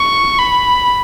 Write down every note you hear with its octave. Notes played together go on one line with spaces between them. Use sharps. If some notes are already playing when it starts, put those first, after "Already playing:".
Already playing: C#6
B5